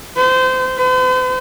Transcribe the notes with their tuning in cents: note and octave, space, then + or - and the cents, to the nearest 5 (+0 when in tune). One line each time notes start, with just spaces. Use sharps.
C5 -25
C5 -45